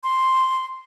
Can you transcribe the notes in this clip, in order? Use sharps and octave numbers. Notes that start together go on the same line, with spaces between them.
C6